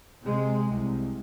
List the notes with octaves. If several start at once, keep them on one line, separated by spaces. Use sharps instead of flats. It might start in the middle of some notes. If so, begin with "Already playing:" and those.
C3 G#3
C2